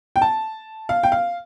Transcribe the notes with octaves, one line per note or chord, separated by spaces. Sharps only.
G5
A5
F5
G5
F5